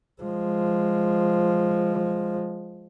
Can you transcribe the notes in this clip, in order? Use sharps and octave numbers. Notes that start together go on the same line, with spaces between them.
F3 G#3